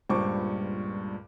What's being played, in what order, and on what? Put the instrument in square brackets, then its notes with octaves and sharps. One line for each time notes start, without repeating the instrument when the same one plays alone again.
[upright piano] C#2 G2 A#2 C5 C#6 D6